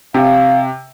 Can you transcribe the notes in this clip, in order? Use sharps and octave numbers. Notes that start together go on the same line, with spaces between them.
C3 F5